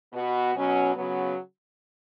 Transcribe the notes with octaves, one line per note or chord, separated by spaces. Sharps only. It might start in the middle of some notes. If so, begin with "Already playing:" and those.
B2 B3 F#4
B2 F#3 C#4
C#3 F#3 B3